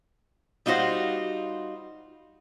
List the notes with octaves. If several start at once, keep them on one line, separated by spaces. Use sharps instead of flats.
G3 D#4 F4 F#4 C5